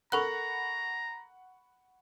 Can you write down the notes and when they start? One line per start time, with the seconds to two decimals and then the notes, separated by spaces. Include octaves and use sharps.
0.12 A4 A#4 F#5 A#5 B5 C#6 F#6